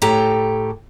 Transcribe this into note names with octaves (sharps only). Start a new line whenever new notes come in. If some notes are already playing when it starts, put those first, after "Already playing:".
A2 G4 A4 G5 A#5